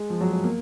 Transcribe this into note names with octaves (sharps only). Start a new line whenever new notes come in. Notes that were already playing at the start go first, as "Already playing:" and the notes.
Already playing: G#3
F3
F#3
G#3
A#3